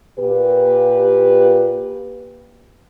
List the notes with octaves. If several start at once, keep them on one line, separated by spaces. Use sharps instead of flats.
A#2 G4 B4